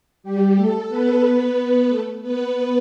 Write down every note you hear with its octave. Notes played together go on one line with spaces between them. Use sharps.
G3 G4
A3 A4
B3 B4
B3 B4
A3 A4
B3 B4